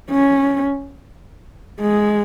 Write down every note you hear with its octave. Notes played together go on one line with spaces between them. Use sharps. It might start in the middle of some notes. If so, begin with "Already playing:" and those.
C#4
G#3